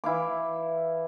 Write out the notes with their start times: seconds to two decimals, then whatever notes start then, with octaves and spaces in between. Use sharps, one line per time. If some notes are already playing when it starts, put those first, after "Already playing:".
0.04 E3 E4 F5 D6